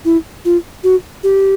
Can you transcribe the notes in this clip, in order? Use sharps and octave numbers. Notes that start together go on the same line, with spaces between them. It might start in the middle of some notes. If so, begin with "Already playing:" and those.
E4
F4
F#4
G4